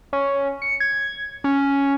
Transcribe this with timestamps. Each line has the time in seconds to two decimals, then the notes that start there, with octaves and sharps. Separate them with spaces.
0.13 C#4
0.62 C#7
0.80 G#6
1.44 C#4